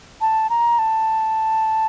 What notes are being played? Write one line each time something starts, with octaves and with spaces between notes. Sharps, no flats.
A5
A#5
A5